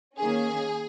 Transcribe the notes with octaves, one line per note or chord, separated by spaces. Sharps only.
D#3 A#3 C#4 G#4